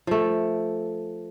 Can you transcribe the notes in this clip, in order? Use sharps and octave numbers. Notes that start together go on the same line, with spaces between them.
F3 A3